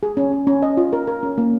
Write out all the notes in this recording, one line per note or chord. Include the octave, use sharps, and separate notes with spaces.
G#4
C#4
C#4
C#4
D#5
F4
A#4
A#4
C#4
A#3